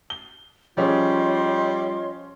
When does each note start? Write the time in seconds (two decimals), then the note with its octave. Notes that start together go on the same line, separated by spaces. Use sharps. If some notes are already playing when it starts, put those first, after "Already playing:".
0.10 G7
0.77 F3 G3 C#4 F4 G#4 C#5 D#5 C6